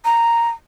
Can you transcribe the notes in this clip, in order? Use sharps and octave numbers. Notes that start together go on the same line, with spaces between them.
A#5